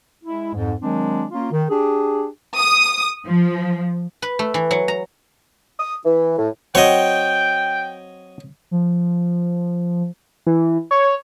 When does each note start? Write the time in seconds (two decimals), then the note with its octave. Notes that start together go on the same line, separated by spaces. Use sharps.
0.24 G#3 E4
0.54 F2 G#2
0.81 D#3 F#3 G#3 C4 D4
1.31 A#3 C#4 F4
1.52 D#3
1.69 D4 G4 G#4
2.57 D#6
3.26 F3
4.22 B4
4.39 A3
4.54 E3
4.71 F#3
4.88 A#5
5.80 D#6
6.05 E3
6.38 A2
6.75 F#3 C4 F#4 C#5 D#5 G5
8.71 F3
10.47 E3
10.91 C#5